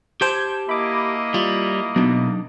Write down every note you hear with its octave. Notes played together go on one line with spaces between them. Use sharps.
G4 C5 G5 A5 G6 G#6
A#3 E4 D#5 B5 D6
G3 F4
B2 F#3 D4 D#4